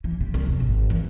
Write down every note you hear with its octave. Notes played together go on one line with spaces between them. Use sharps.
E3
C3
C2
E1
G#1
E3